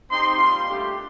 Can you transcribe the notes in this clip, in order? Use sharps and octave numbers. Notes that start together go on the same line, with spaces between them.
C4 D#4 G4 C6
G3 A#3 F4 C6
A3 D4 G4